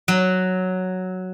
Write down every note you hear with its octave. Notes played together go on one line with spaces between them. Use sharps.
F#3